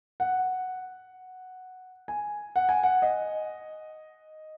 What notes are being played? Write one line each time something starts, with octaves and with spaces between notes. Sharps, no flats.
F#5
G#5
F#5
G#5
F#5
D#5